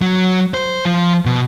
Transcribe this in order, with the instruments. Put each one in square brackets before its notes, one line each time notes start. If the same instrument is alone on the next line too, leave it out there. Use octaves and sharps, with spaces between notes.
[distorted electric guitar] F#3
C5
F3
B2